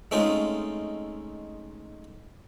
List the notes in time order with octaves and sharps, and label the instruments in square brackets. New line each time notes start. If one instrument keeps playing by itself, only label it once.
[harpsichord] G#3 A3 C4 C#4 D#4 F4